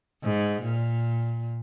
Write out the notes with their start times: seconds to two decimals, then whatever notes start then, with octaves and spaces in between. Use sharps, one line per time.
0.23 G#2
0.62 A#2